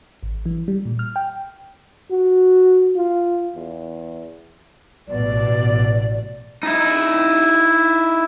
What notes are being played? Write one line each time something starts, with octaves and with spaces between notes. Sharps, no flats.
G#1
E3
G3
A#2
F6
G5
F#4
F4
E2
A1 B2 D5
D#4 E4